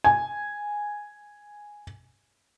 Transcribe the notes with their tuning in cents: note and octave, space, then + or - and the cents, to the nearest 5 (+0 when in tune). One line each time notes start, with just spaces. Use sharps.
G#5 -5